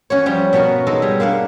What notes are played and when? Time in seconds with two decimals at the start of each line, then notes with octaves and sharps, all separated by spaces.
0.10 C#4 F#4 C#5
0.26 F3 G3 G5
0.53 B2 B3 C#4 F#4 A#4
0.87 G#3 D#4 A4 D#5
1.02 G3 G#4
1.20 A#3 D4 F5 F#5